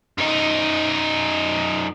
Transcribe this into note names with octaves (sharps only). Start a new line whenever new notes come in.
F#2 D#4